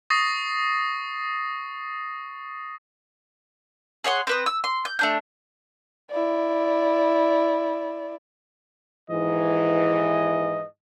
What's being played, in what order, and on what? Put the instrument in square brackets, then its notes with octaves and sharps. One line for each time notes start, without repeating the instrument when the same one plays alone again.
[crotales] C#6 D#6 A6 A#6 C7
[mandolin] G#4 C#5 F#5 C6
C4 B4 D#6
E6
C6
G6
A3 D4 G6
[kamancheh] E4 D5
[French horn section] D#2 G#2 E3 [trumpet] D#5